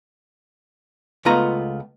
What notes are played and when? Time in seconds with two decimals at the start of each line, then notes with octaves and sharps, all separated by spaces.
1.25 C#2 A3 B3 F4 D#5 A#5